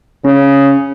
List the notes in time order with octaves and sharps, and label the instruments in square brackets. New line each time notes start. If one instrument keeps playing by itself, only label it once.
[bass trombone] C#3 [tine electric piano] C#4